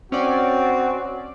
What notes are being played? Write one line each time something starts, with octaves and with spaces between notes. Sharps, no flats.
C4 C#4 F#4 D5